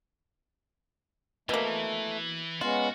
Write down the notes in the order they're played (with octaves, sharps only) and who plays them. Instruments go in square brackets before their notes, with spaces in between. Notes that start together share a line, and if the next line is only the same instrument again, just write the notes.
[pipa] B2 A#3 [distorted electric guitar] E3 [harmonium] A3
[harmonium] G#3 B3 C#4 [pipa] F4 [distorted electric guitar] F#4